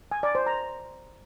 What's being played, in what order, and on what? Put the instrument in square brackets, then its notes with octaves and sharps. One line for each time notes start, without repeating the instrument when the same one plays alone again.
[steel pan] G#5
D5
C5
A#5